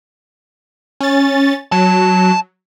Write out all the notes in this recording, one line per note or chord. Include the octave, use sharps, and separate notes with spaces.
C#4 A6
F#3 A5